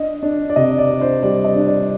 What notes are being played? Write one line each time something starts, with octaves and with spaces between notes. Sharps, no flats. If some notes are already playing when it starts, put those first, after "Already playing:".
Already playing: D4 D#5
D4
D5
C3 D#5
D5
D4
C5
G3 D5
D#5
D4
D5